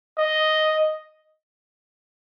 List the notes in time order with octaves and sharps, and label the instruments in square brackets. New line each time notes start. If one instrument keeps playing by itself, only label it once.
[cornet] D#5